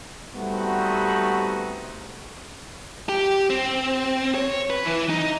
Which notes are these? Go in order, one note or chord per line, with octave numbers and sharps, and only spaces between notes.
G3 A3 B3 C4 D#4 F#4
G4
C4
C#5
B4
E3
D#4